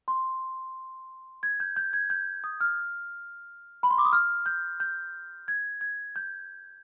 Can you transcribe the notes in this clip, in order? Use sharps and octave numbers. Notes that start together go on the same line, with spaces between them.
C6
G#6
G6
G6
G#6
G6
D#6
F6
B5
C6
D6
D#6
F6
G6
G6
G#6
G#6
G6